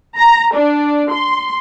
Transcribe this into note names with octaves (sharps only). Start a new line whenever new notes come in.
A#5
D4
C6